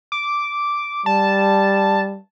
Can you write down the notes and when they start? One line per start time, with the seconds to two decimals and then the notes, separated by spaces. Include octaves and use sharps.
0.12 D6
1.06 G3 A5